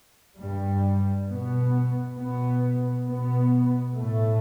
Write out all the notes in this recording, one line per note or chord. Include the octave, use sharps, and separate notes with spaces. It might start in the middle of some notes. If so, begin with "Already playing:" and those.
G2 G3
B2 B3
B2 B3
B2 B3
A2 A3